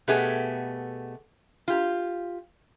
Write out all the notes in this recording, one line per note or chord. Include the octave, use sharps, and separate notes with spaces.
B2 A3 B3 G4 G#4
F4 G4